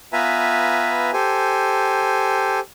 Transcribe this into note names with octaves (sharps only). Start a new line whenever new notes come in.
B3 F4 B4 E5 G#5 A#5
G4 A4 C5 G#5